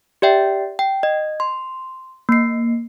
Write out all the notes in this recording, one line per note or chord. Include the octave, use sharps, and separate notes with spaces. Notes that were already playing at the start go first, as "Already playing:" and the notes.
G4 D5 E5 G5
G5
D#5
C6
A#3 C7